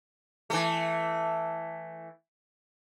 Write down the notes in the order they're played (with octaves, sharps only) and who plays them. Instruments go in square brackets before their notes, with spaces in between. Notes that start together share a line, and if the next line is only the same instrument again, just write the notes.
[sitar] E3 A3